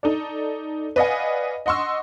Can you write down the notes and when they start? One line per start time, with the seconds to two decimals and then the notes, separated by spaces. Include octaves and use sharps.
0.03 D#4 A4 D5
0.96 B4 D5 D#5 F5 F#5 G#5
1.66 D#5 F#5 C6 C#6 E6